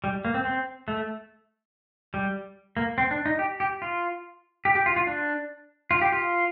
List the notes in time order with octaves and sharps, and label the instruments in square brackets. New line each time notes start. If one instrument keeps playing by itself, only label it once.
[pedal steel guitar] G3
A#3
C4
C4
A3
G3
A#3
C4
D4
D#4
G4
G4
F4
G4
G4
F4
F4
D4
F4
G4
F4